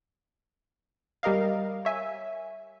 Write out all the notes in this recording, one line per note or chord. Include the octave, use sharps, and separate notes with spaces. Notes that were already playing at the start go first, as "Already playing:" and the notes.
G3 G4 A#4 D#5 F5
C#5 E5 G#5